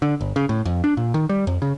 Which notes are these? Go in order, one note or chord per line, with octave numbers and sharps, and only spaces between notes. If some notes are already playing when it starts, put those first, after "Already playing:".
D3
G1
C#3
A2
F2
D4
A#2
D#3
G3
F2
C#3